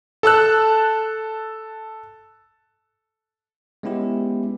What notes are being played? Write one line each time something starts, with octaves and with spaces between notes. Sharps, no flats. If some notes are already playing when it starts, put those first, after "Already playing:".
A4 A5 E6 F#6
G#3 B3 C#4 E4 G4